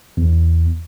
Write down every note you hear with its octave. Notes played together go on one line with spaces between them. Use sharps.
E2